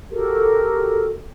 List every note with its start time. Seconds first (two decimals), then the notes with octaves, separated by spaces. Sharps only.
0.11 F#4 G4 A4 A#4